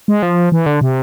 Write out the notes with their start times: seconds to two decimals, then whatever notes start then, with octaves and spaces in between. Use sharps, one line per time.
0.08 G#3
0.23 F3
0.52 E3
0.66 D3
0.81 C3